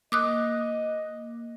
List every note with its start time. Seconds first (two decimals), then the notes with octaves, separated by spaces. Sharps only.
0.12 A#3 D#5 D6 D#6 F#6